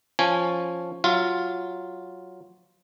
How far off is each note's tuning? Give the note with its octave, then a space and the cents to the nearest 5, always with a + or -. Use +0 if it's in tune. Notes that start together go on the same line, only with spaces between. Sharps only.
F3 +0 C#4 +0 G#5 -15
F#3 +0 F4 +0 E5 +45